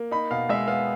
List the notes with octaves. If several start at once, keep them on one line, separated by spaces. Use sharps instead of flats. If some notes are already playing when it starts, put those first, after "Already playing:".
Already playing: A#3
D#4 B5
B2 F5
G#3 E5
B3 F5